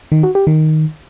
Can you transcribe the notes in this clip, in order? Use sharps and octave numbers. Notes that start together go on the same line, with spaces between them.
D#3
F#4
G4
D#3